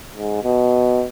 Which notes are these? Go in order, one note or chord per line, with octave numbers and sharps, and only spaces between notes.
G#2
B2